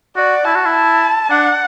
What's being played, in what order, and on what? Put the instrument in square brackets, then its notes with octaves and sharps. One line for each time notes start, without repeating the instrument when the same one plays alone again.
[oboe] F#4 [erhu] D5
[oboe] E4 [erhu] A5
[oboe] F#4
E4
[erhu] A5
[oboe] D4 [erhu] F#5